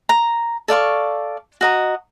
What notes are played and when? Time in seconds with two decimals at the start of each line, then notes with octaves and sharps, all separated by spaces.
0.09 A#5
0.68 A4 D5 F5 C#6
1.61 F#4 D#5 A#5